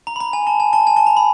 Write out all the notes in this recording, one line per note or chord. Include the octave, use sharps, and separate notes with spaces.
A#5
B5
A#5
G#5
A5
G#5
A5
G#5
A5
A#5
B5